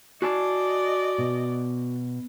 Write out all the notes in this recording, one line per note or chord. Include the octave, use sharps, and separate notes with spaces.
F#4 D5 D#5 G#5 A5
B2